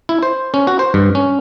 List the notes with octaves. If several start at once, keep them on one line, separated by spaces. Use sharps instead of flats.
E4
C5
C#4
F#4
C5
G2
C#4